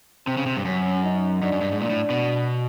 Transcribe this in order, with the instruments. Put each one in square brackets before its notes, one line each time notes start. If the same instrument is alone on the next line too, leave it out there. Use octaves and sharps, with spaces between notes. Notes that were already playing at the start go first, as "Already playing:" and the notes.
[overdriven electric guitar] C3 [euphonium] C4
[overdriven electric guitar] C#3
C3
G2
[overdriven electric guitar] F#2 [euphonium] C#4
[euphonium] D#4
[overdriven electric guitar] F#2 [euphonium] D4
[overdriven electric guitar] F#2
G2
G#2
[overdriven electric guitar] A#2 [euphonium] D4
[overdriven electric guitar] A2
B2